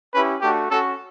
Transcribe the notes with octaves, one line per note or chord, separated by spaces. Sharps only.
C#4 E4 G4 B4
A3 D4 F#4 G4
C#4 F#4 A4